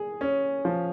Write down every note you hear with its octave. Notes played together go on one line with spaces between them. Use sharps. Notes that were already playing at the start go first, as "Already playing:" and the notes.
Already playing: G#4
C#4
F3